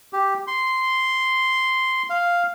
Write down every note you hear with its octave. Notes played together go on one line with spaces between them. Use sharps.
G4
C6
F5